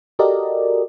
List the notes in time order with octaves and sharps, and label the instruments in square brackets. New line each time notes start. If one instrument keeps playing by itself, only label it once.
[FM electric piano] F#4 G4 A4 A#4 D5 D#5